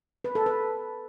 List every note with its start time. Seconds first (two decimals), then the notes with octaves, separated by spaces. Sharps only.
0.24 B4
0.35 A4
0.46 B4